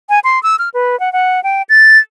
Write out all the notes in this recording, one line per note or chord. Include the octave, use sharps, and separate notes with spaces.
G#5
C6
E6
F6
B4
F#5
F#5
G5
A6